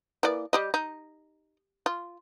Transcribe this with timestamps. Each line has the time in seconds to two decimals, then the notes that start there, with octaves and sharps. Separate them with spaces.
0.23 E3 A#3 D5
0.53 G3 G4 D#5
0.74 D#4
1.86 F4